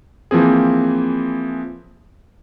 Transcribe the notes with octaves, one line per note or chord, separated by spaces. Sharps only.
E3 F3 A#3 C4 G#4